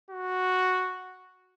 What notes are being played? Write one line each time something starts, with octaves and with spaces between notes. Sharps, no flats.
F#4